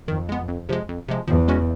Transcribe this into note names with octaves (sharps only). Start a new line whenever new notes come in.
F2 D#3
G#3 B3
F2
C3 F3 G#3
F2
C3 F3 G#3
E2 F3
G#3 C#4 F#4